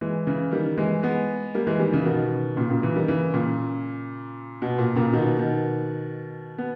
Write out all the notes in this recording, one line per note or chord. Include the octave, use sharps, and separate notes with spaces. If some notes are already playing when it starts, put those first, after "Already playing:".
E3 G#3
C#3 E3
D#3 G3
E3 G#3
G#3 B3
G3 A#3
E3 G#3
D#3 G3
C#3 E3
B2 D#3
A#2 C#3
A#2 C#3
C#3 E3
D#3 G3
C#3 E3
A#2 C#3
B2
A#2
A#2 C#3
B2 D#3
B2 D#3
B3